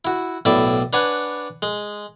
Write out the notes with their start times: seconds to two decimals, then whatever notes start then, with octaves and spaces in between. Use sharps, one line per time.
0.05 E4 F#4
0.45 B1 A2 E4 D5 E5
0.93 D4 B4 C#5 F#5 G#5
1.62 G#3